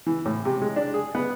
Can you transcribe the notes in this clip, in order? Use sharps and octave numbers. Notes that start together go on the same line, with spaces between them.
E3
A2
C3
G#3
D4
G#4
B3